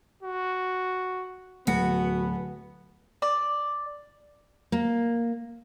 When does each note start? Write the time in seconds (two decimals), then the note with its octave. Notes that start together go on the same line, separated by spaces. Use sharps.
0.23 F#4
1.67 D1 B3 F#4 C#7
3.22 D5
4.72 A#3